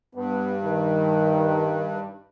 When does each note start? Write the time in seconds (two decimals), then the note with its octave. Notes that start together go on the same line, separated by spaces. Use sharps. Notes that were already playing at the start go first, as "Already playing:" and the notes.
0.15 G2 B3
0.64 D#3